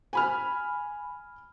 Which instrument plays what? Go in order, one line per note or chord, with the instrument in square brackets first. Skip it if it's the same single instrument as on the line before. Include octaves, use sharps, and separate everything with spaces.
[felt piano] G#5 B5 F6